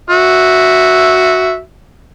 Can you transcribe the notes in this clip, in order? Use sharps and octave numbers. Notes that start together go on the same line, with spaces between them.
F#4 E5